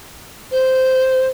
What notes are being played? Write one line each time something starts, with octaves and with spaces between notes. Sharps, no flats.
C5